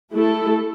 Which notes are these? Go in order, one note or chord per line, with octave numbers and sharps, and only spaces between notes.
A3 E4 A4